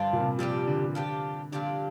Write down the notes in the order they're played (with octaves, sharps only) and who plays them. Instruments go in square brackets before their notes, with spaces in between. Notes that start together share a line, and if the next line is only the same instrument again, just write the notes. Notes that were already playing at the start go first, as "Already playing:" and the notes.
Already playing: [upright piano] G2 [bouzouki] D3 F3 D4 F4
[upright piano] A#2
C3
[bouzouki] A#2 G3 D4 G4 [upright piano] F3
[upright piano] D3
[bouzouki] F3 D4 G4
[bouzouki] A#2 F3 D4 G4 [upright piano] D3